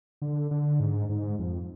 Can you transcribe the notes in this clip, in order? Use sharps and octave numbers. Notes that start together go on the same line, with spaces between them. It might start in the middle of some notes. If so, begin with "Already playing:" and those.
D3
D3
G#2
G#2
F2